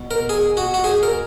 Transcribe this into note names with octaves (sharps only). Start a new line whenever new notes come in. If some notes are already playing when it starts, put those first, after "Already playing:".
Already playing: B2
A#4
G#4
F#4
F#4
G#4
A#4